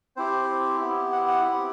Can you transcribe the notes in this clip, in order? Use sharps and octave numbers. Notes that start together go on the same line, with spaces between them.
C4 E4 G4 C5
B3 E4 G4
F#5
F#5
C4 E4 G4